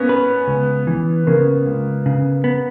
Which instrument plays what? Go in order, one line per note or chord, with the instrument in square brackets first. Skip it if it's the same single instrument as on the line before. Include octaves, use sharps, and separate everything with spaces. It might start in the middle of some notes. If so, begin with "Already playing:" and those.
Already playing: [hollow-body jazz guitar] A#3 [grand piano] B3 C#4
[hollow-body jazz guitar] B4
C#2
E3
[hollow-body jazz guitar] C#3 [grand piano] A#3
[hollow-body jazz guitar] C#2
C#3
B3